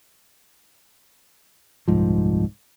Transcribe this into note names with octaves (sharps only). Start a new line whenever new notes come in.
D#1 C2 G#2 F3